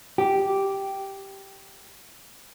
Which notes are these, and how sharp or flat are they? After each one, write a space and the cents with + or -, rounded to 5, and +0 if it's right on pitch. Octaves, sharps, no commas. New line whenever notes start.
G4 -5